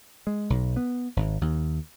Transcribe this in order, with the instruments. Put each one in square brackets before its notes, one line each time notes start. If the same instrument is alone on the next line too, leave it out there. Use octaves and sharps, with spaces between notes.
[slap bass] G#3
B1
B3
G#1
D#2